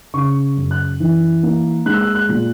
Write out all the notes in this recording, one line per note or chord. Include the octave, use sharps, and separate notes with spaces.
C#3 C#6
F#2
F#6
E3
A#3
G#3 F#6
E6
F#6
F#6
A#2